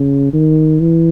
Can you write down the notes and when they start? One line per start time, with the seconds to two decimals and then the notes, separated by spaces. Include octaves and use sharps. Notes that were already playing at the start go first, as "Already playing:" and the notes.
Already playing: C#3
0.33 D#3
0.80 E3